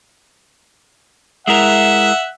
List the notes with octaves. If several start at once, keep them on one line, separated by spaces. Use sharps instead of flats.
G#3 E4 A#4 E5 F#5